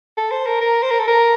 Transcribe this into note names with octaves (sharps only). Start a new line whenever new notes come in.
A4
C5
A#4
A#4
C5
A#4
A4
A#4